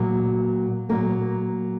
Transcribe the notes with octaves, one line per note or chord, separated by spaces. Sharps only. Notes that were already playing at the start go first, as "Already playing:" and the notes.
Already playing: A#2 F#3 A#3
A#2 F#3 A#3 A#4